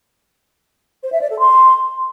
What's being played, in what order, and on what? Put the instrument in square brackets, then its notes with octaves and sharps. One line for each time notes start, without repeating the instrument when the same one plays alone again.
[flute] C5
E5
D5
A4
C6